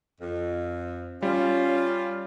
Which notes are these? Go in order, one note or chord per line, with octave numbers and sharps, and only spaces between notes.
F2
G3 C#4 F4